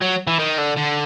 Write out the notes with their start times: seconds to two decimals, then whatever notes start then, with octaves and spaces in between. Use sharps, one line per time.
0.01 F#3
0.27 E3
0.39 D#3
0.58 D3
0.77 D3